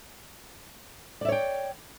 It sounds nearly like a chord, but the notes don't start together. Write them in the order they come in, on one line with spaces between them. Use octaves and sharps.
D5 E5 C#5 G5